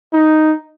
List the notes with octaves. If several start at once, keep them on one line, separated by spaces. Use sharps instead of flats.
D#4